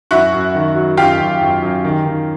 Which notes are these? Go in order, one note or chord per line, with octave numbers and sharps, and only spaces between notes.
F#2 E4 F#4
F#2
D#3
F#3
F#2 F4 G4
F#2
F#2
F#2
D#3
D#3